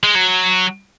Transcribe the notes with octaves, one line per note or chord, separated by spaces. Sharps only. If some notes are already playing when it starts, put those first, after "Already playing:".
G#3
F#3